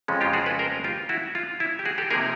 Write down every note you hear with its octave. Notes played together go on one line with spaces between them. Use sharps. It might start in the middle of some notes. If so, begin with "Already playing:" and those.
F2 C#3 F3 G#3 C#4
F4 G4
F#4 G#4
A4 B4
A#4 C5
F4 G4
E4 F#4
F4
E4
G4
F#4 G#4
G4 A4
C3 F3 A#3 D#4 G#4 A#4